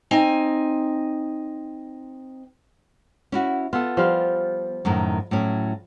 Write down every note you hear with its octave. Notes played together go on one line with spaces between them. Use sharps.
C4 D#4 G#5
C#4 E4 F#4
B3 F4 A4
F3 G3 F4
F#2 A2 D#3
A2 F#3 C#4